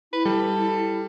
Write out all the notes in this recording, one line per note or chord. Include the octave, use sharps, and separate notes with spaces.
E4 B4
G3 A4